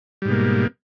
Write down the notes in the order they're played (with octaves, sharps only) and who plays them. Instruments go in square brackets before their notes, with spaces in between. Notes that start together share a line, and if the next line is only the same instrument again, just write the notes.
[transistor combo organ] G3
G#2
B2
A#3